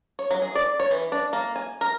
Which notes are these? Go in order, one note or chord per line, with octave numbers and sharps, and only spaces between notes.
C#5
F#3
G#4
D5
C#5
E3
D4
A#3
G#5
A#4